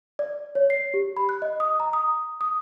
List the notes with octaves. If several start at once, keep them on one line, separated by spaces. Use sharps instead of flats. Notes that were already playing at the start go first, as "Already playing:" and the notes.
D5
C#5
C7
G4
B5
F#6
D#5
D#6
A#5
D#6
D#6